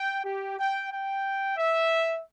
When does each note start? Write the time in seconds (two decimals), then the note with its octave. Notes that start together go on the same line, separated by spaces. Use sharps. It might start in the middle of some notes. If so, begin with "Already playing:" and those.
Already playing: G5
0.24 G4
0.58 G5
0.91 G5
1.57 E5